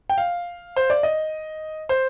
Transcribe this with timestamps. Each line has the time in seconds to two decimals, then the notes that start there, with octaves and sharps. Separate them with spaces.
0.10 G5
0.18 F5
0.76 C5
0.90 D5
1.03 D#5
1.89 C5